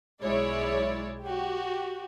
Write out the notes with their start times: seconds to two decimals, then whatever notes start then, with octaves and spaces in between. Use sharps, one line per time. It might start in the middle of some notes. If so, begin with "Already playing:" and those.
0.23 B1 G#3 E4 C#5 D5
1.22 F#4 G4